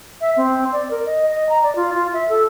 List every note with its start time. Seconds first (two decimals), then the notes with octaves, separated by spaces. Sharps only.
0.21 E5
0.37 C4
0.72 D5
0.91 A#4
1.06 D#5
1.29 D#5
1.49 A#5
1.63 D5
1.76 F4
1.94 F4
2.13 E5
2.29 A4